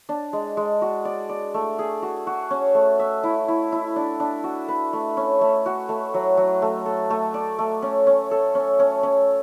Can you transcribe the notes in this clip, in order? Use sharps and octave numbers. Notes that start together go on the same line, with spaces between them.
D4
G#3
G#3
F#4
D5
D5
A3
G#4
F#4
F#4
C#4
A3
E5
E4
E4
E4
D4
D4
F#4
B4
A3
C#4
A3
F#4
A3
F#3
F#3
A3
A4
A3
D5
A3
C#4
C#4
A4
C#4
C#4
C#4